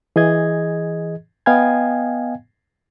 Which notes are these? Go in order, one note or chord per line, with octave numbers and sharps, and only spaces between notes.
E3 G#4 D#5 G#6
B3 D#5 F5 G5 G#5 G#6